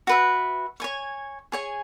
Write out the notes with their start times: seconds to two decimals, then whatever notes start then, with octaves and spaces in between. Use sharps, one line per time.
0.07 F#4 B4 E5
0.80 C#5 G#5 C#6
1.52 G#4 C#5 G#5